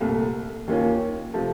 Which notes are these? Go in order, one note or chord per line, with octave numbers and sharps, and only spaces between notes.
C2 A#2 A3
D#2 D#3 A#3 C#4 F4
C3 F3 A3